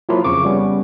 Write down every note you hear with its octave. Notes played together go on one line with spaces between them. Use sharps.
F3 F#3 A#3 E4 F4
F2 C#3 C#6 D6
G3 B3 C#4